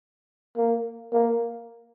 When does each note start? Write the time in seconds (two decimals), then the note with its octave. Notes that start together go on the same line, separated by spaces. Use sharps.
0.57 A#3
1.12 A#3